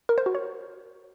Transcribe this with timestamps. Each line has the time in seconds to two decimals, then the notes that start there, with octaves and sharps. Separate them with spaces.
0.09 A#4
0.18 C5
0.26 F#4
0.35 C#5